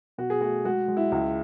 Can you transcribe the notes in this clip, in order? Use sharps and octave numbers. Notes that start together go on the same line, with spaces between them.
B2 F#4
G#4
A3 F#4
G#3 F#4
G#3
E4
C#2 E4